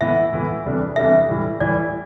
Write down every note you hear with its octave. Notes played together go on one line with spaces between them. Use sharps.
A2 E3 B3 E4 E5
A2 E3 B3 E4
E2 C3 G3 D4 A4
E2 C3 G3 D4 A4 E5
A2 E3 G3
A2 E3 G3 D5